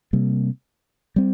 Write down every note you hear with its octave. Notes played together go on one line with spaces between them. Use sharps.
C3 G3 A#3
G3 C4